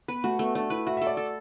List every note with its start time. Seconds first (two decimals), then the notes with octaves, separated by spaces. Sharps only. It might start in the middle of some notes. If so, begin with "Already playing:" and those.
0.08 B3 B4
0.24 A3 F#4
0.39 A3 B3
0.55 A3 D4
0.70 E4 B4
0.86 F#4 E5
0.97 E5
1.02 A4
1.07 D5
1.17 A4